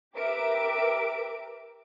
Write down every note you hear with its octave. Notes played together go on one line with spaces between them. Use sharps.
G4 A#4 B4 E5 D6 D7